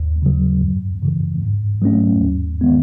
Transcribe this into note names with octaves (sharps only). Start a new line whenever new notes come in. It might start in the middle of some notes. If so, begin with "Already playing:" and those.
Already playing: D#2
C#3 F#3
F#2
C#3 E3
G#2
F#3 A3 C#4
D#2
D#3 G#3 B3